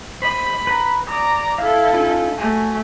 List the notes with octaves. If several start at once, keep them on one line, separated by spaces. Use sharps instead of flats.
C5 D#5 B5
B4 A#5
D5 A#5 D#6
E4 A4 E5 F5
C#4 D#4 F4
A3 F#4 G#5